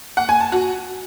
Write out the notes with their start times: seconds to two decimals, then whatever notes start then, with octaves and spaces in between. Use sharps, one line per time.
0.17 F#5
0.29 G#5
0.41 A5
0.52 F#4